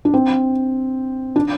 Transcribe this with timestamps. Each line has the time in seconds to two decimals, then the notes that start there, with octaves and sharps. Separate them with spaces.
0.05 D4
0.14 C4
1.36 D4